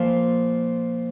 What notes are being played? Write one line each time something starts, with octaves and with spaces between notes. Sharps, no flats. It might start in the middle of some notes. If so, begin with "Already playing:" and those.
Already playing: A#2 F3